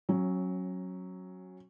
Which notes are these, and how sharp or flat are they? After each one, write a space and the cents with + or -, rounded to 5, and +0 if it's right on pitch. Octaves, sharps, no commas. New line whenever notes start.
F#3 +0 C#4 -20